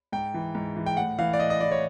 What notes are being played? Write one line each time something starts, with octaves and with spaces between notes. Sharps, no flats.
G#2 G5
E3
G#2
E3
G5
A2 F#5
E3 F5
D5
A2 D#5
D#5
E3 D5
C#5